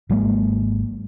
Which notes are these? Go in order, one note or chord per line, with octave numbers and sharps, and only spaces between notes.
G#1 F#3 G#3 A#3